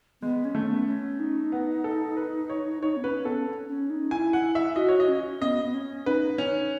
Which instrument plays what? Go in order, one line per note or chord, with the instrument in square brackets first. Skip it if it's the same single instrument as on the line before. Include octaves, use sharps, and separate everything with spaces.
[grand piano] G#3 [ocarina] B3
[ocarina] C#4
[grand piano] A3
[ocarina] B3
C#4
D#4
[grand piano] B3
A4
B4
C#5
[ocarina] D#4 [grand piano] C#5
[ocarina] B3
[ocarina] C#4 [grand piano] B4
[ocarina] B3 [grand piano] A4
[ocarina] C#4
C#4
D#4
[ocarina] E4 [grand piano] G#5
[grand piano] F#5
E5
[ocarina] F#4 [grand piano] D#5
[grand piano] C#5
D#5
[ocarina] C#4
[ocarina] B3 [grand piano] D#5
[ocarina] B3
C#4
[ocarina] D#4 [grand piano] B4
[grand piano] C#4